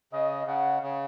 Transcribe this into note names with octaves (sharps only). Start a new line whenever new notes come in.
C#3 D#5
C#3 F#5
C#3